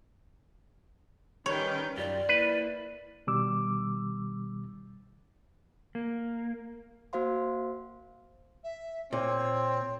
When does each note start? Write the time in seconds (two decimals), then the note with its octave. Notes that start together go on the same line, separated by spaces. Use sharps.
1.46 D#3 G3 C#4 B4 C#5 G5
1.97 F#2 F4 G4 D5
2.29 A#3 E4 B4
3.27 B2 D#3 G3 D6 E6
5.95 A#3
7.13 A#3 F#4 C5 F5 C6
8.64 E5
9.13 A#2 C4 C#5